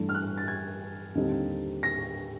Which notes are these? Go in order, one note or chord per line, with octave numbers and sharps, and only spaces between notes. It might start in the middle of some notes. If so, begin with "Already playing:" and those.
Already playing: G2 E3 A3 D4
F6
F#6
A6
G#6
D#2 D3 G3 C4 D#4
A#6